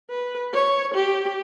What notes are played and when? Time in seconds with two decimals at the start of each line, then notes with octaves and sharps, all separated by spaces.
0.10 B4
0.54 C#5
0.95 G4